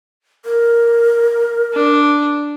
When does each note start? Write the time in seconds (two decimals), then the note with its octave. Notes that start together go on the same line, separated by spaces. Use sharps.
0.45 A#4
1.74 D4